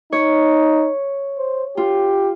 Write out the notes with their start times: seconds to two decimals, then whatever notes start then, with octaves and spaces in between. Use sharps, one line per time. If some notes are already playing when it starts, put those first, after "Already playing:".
0.12 D#4 C#5
1.38 C5
1.77 F4 G4